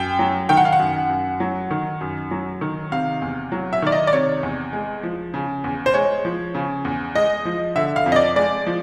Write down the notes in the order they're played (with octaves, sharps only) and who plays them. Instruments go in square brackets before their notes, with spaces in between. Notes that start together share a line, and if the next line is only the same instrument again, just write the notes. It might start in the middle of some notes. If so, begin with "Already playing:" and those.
Already playing: [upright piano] F#2 G5
F#3
D#3 G5
F#5
F5
F#5
F#2
F#2
F#3
D#3
F#2
F#3
D#3
C3 F5
E2
F#3
E5
D#3 D5
D#5
D5
C3 C#5
E2
G#3
F3
C#3
E2
C5
G#3 C#5
F3
C#3
E2
G#3 D#5
F3
D3 E5
F5
F2
D#5
D5
G#3 D5
F3